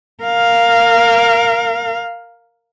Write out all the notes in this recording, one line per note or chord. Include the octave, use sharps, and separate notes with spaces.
A#4 F5